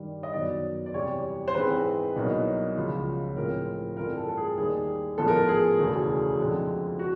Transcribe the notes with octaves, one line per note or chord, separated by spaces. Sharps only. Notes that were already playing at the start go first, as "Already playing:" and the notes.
Already playing: G2 D#3 G3
D#5
F#2 D#3 F#3 B3 D5
D5
E2 C3 E3 G3 C#5
C5
G#2 E3 G#3 C4 B4
C2 B2 F#3 A#3 D#4
C#2 C#3 F3
A2 F3 G#3 C4 A#4
G2 E3 A3 C4 F4 A#4
A4
A4
G#4
D#2 D#3 G3 A#3 G#4
A1 G#2 F3 G#3 B3 A4
A#4
A4
G#4
E1 D2 C#3 E3 A3
F2 D3 F3 G#3 C4
F#4